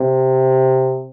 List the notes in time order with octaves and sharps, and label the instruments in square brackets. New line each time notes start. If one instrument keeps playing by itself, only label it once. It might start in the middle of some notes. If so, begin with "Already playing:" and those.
Already playing: [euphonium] C3